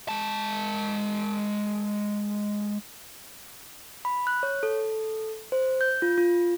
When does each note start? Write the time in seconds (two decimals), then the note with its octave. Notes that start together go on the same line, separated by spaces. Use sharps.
0.08 G#3 A5
4.05 B5
4.27 F#6
4.43 C#5
4.63 A4
5.52 C5
5.81 G6
6.02 F4
6.18 F4